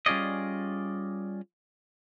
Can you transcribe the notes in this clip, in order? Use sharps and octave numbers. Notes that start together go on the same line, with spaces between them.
G3 C#4 F4 G#4 D5 D#5